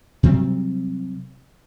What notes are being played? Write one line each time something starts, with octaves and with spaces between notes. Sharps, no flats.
C3 F#3 G3 C4